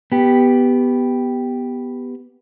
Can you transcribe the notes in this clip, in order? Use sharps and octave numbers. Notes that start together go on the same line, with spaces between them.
B3 G4